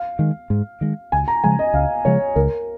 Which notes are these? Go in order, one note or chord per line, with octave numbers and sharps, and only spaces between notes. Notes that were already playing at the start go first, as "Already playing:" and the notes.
Already playing: F5
D#3 G#3
G#2
D#3 G#3
C#2 G#5
A#5
C#3 F3 G#3 G#5
D#5
C#2 F5
C#3 F3 G#3 C#5
C#2 A#4